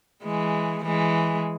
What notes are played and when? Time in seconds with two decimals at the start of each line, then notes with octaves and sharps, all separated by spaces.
0.23 E3 G#3
0.84 E3 G#3